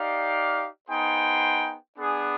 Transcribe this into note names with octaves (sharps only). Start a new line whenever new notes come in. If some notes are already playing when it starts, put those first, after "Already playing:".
Already playing: D#4 G4 D5 F5
B3 D#4 G#4 C5 G5
B3 D4 G#4